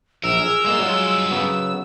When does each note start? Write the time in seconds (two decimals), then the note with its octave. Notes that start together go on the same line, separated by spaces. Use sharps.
0.24 A#1 A#4 E6
0.40 G#4
0.65 G2 G#3 A#3 D5 C6
0.79 F#3 G#3 F4
1.31 C#3 F#3 B3